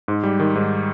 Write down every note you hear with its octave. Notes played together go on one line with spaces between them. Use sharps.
G#2
G3
D#3
G#2